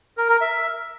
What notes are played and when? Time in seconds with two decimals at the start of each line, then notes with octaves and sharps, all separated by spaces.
0.17 A#4
0.29 A#4
0.41 E5